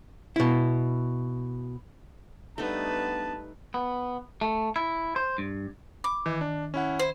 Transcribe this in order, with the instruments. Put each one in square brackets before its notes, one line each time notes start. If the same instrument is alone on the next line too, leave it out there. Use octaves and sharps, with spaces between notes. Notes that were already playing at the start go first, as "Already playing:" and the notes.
[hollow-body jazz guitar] B2 E4
[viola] G3 B4 [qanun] A3 D#4 [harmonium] B3 D4 [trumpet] A5
[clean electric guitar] B3
A3
E4
C5
G2
[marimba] B5 [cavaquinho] D6
[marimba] D#3 [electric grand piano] E3
[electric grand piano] D4
C#4 E4 F#5
[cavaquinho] E4 C5